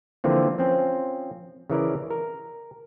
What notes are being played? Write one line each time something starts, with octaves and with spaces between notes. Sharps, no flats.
D3 E3 F3 A#3 C4
F3 C4 C#4
C#3 E3 A#4 D5
A#4